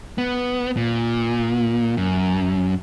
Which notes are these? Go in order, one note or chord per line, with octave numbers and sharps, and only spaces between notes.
B3
A#2
F#2